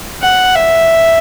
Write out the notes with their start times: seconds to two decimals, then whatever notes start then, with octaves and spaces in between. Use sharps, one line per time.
0.23 F#5
0.56 E5